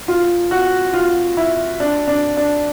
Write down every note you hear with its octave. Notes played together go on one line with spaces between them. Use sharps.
F4
F#4
F4
E4
D4
D4
D4